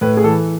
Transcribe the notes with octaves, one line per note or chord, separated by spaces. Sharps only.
A2 B4
G#4
E3 A4